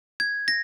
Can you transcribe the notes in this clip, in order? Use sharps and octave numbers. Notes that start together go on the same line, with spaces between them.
G#6
A#6